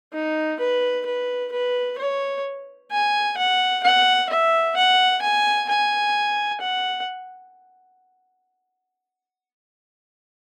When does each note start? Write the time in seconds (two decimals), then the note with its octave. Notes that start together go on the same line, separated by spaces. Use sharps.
0.13 D#4
0.60 B4
1.06 B4
1.52 B4
1.99 C#5
2.91 G#5
3.38 F#5
3.84 F#5
4.30 E5
4.77 F#5
5.22 G#5
5.69 G#5
6.61 F#5